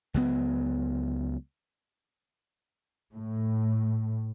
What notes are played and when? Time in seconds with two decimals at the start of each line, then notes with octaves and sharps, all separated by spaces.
0.14 C#2 F#3 B3
3.14 A2